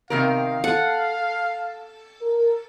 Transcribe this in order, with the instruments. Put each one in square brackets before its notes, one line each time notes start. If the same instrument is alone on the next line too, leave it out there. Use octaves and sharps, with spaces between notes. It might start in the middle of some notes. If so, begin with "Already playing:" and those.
[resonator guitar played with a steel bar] C3 D#3 A#4 [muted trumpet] F5
[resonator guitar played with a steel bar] A4 [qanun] F#5
[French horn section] A#4